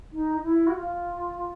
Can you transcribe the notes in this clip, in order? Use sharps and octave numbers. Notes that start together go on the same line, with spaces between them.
D#4
E4
F#4
F4